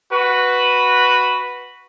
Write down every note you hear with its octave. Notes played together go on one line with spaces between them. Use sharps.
F#4 B4